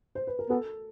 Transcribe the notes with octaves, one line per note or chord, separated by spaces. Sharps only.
C5
B4
A#4
B3 A4